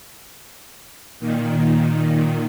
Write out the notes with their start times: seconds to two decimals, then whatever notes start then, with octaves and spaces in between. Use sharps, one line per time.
1.20 A#2 D#3